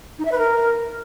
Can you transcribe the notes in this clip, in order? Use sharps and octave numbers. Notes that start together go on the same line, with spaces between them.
D#4
E5
B4
A#4